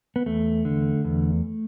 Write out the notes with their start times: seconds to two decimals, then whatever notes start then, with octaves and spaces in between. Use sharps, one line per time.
0.16 B3
0.26 E2 A3
0.65 D3
1.04 E2